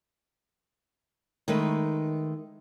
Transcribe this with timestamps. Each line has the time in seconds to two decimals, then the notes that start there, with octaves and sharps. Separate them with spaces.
1.48 D#3 G#3 A3 D#4 B4